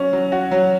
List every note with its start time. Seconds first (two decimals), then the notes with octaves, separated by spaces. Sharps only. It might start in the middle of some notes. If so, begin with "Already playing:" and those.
Already playing: F#3 C#4
0.13 F#3
0.32 F#4
0.51 F#3